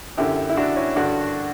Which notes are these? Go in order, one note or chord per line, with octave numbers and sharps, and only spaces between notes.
F#2 D3 E4 G4
E4
D4 F#4
C#4 E4
G2 D3 D4 F#4